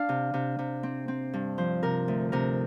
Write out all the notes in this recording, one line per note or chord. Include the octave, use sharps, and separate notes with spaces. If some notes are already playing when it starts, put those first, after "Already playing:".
Already playing: D4 F5
C3
C3
C3
C4
C4
G2
F3 C5
C3 A#4
D2
C3 A#4